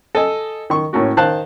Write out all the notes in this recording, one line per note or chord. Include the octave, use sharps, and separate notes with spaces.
A4 D#5 G#5
D#3 C#6
A2 A#3 C#4 F#4
D#3 C5 F5 A5 F#6